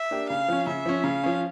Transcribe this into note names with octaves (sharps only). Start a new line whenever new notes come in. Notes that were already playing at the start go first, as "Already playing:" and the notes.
Already playing: E5
A#3 D4 G4
C#3 F5
F3 C#4
C#3 E5
F3 C#4
C#3 F5
F3 C#4